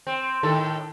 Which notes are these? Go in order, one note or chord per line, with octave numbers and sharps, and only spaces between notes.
C4
A2 D#3 A4